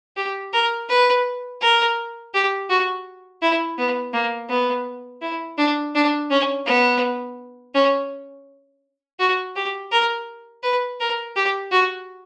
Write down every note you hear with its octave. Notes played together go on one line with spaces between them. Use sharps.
G4
A#4
B4
A#4
G4
F#4
E4
B3
A#3
B3
E4
D4
D4
C#4
B3
C#4
F#4
G4
A#4
B4
A#4
G4
F#4